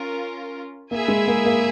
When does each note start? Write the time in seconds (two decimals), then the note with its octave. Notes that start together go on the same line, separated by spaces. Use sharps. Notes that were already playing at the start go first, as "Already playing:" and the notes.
Already playing: C#4 F4 A#4
0.90 A#3 E4 G#4 E5 G#5
1.08 G#3
1.27 A#3
1.45 A#3